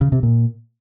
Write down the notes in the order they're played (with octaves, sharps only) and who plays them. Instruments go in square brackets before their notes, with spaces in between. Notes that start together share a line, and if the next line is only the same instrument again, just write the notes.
[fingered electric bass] C#3
C3
A#2